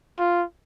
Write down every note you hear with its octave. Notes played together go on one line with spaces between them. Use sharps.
F4